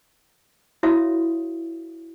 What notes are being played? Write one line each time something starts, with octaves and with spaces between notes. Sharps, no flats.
E4 F#4 C#5 E5 F5 D#6